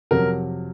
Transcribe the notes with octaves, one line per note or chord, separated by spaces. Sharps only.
F2 C3 F#3 A#4